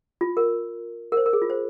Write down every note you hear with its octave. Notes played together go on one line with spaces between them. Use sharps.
F4
A#4
A#4
C5
A#4
G#4
F4
C5